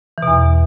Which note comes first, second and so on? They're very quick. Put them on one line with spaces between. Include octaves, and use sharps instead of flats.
E3 B2 E2